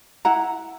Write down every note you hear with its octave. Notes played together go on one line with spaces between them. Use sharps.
E4 F#5 A#5